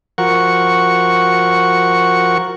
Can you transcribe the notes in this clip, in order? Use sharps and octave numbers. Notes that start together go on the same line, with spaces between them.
F3 F#4 A#4 F#5 C#6